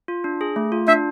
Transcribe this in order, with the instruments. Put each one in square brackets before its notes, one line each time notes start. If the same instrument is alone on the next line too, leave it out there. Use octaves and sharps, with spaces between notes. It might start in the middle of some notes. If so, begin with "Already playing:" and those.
[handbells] F4
D4
G#4
A3
F4
[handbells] D4 [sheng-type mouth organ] E5